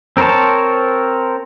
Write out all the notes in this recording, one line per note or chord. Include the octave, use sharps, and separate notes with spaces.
C4 A#4 C5 C#5 A5